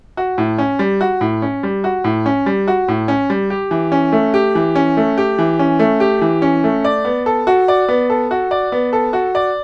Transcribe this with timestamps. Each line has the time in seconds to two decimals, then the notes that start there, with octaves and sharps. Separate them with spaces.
0.17 F#4
0.38 A2
0.58 C#4
0.79 G3
1.01 F#4
1.21 A2
1.42 C#4
1.63 G3
1.84 F#4
2.04 A2
2.26 C#4
2.46 G3
2.68 F#4
2.88 A2
3.08 C#4
3.30 G3
3.50 G4
3.71 E3
3.92 C#4
4.13 A3
4.34 G4
4.55 E3
4.75 C#4
4.97 A3
5.18 G4
5.39 E3
5.59 C#4
5.79 A3
6.00 G4
6.21 E3
6.42 C#4
6.64 A3
6.85 D5
7.05 B3
7.26 A4
7.47 F#4
7.68 D5
7.89 B3
8.10 A4
8.31 F#4
8.51 D5
8.72 B3
8.93 A4
9.13 F#4
9.35 D5